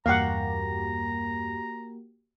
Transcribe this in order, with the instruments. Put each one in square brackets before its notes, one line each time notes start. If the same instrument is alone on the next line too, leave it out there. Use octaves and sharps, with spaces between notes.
[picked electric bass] E2 G2 [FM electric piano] A#3 F#4 G4 [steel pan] F5 F#5 [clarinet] A#5